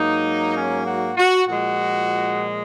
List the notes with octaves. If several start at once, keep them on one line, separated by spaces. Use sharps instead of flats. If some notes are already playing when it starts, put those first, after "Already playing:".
Already playing: G#2 F#3 A#3 D#4
C#4
F#4
F#4
A#2 F3 G#3 F#4